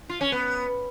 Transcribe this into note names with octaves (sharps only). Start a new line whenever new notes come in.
F4
C#4
B3